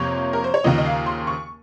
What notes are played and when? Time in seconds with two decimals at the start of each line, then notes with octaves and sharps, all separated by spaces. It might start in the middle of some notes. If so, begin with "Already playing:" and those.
Already playing: F2 C3 A#3 C#5
0.33 A#4
0.44 C5
0.54 C#5
0.64 D#2 C#3 F3 A#3 D#5
0.78 D#5
0.86 F5
1.06 C6
1.27 C#6